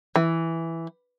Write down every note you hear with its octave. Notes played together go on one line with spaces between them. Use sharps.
E3